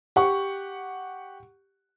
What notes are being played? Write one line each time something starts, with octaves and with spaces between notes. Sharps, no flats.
G4 F#5 C#6